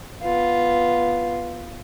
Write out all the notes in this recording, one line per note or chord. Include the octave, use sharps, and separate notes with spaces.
B3 F4